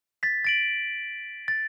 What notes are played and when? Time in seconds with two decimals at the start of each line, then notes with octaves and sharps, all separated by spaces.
0.23 A6 B6
0.45 A6 D7 F#7
1.48 A6